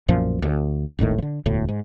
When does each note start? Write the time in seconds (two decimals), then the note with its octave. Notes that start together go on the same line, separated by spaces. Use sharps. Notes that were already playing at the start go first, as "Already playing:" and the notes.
0.08 B1 F#2 A#2 F3
0.42 D2
0.99 D#1 G#1 A2 D#3
1.18 D3 F3
1.46 E1 D2 A2
1.69 G#2